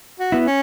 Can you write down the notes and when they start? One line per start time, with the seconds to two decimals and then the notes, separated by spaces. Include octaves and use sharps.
0.20 F#4
0.32 B3 E4
0.46 C#4